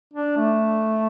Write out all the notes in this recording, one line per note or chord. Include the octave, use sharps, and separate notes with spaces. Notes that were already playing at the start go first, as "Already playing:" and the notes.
D4
A3